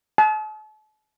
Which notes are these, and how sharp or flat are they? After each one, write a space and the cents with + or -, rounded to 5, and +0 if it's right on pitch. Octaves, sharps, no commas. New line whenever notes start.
A5 -40